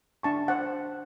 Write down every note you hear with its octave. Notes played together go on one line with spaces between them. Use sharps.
D4 A5 C#6
C5 F#5